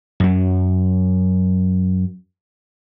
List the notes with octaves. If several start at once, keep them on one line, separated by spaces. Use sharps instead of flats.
F#2 F#3